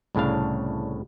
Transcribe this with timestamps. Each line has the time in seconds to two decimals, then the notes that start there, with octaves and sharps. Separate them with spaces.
0.15 C2 A2 C#3 D4 F5